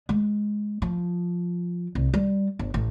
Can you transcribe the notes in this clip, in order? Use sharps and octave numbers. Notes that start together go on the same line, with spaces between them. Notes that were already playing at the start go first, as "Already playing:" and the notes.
G#3
F3
C2
G3
G1
A1